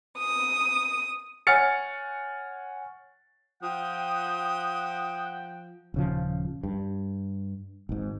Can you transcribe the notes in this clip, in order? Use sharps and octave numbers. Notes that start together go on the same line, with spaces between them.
D#6
C#5 F#5 G#5 F6 A6 C#7
F3 F#5 G5 D#6
D#1 C#3 F3
G2
G#1 G#2